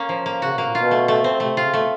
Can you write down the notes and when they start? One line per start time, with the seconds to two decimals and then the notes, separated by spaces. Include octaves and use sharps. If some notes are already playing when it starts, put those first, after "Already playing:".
Already playing: A#3 C#4
0.09 F3
0.26 A#3
0.42 C#3 F#4
0.53 B2
0.58 A#3
0.64 A#2
0.75 B2 F4
0.91 A3
1.08 A3
1.24 C4
1.40 C3 A3
1.51 C3
1.57 C#3 F4
1.74 B2 A3